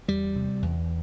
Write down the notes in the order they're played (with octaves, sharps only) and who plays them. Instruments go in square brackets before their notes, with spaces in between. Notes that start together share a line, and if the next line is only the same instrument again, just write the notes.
[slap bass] E2 G3
C3
E2